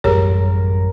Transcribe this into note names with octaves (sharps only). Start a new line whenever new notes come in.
A1 F#2 G3 G4 G#4 A#4 C#5